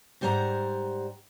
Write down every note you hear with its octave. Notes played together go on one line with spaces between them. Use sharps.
G#2 G3 C5 F#5 A#5